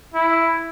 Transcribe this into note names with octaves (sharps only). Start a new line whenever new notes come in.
E4